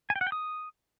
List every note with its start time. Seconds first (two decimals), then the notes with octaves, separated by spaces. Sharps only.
0.10 G#5
0.16 G5
0.21 F#5
0.27 G5
0.32 D#6